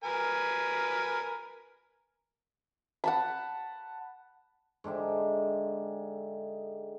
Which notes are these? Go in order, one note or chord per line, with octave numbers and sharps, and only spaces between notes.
A#4 B4 G#5
F#5 A5 B5
G#2 D3 G4 E5